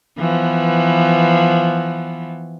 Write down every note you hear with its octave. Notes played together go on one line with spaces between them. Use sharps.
E3 F3 B3